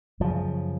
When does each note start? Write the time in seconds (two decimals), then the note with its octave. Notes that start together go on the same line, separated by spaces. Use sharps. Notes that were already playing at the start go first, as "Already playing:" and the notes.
0.20 F#2 C#3 F3